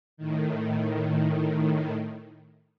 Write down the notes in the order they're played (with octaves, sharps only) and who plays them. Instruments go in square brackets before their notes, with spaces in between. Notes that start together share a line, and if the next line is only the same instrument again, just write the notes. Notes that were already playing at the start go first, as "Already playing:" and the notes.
[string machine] A2 D#3